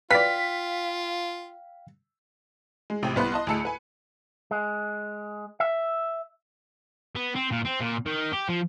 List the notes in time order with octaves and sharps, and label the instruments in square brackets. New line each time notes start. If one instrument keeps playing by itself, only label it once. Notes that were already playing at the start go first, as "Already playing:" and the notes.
[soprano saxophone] F4 [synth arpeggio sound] B4 D5 [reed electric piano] F5 G5 F6 [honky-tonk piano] B6
[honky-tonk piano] G#3
A1 C3 G5
C2 B3 B4 C6 F#6
D#5 A5 C6
D2 G#4 A5 E6 C#7
B4 G#5
[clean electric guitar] G#3
E5
[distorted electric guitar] B3
C4
A#2
C4
A#2
D#3
G4
F3